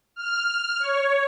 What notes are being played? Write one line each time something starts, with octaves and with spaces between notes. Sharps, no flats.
F6
C#5